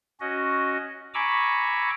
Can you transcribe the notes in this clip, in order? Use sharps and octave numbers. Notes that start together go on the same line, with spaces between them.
C#4 F#4 D#5
G#5 A#5 B5 C#6 D6 E6